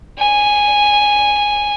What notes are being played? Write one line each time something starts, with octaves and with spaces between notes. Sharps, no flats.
G#5